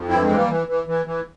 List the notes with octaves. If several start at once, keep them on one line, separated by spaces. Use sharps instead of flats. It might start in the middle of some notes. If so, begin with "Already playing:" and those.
Already playing: F2
G2 C4 E4
G#3 C4
E3
G3 A#3
E3
E3
E3
E3